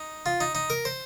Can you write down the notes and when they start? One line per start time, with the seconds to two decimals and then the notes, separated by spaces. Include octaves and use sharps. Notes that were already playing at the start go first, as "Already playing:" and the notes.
Already playing: D#4
0.26 F4
0.41 D#4
0.55 D#4
0.70 A#4
0.85 C5